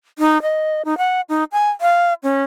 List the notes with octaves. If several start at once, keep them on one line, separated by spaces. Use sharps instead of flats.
D#4
D#5
D#4
F#5
D#4
G#5
F5
C#4